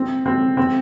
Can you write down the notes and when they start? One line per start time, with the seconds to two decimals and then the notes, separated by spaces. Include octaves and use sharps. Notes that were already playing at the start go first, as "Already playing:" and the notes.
Already playing: C4
0.26 C4
0.57 C4